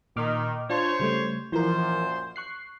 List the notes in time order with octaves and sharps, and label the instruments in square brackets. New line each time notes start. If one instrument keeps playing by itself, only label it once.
[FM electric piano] A#2 D6 F6 [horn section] D#3
[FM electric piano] D4 F4 A5 [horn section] C5 C#5
[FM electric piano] C#3 G3 A3
[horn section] F#2 A#2 C5 [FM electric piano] E3 F3 A#4
[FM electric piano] C#6 F#6 C7